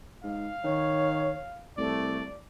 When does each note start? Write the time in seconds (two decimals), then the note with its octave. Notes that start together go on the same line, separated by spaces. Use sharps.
0.23 G#2 F5
0.64 D#3 C#5
1.77 C2 A3 D5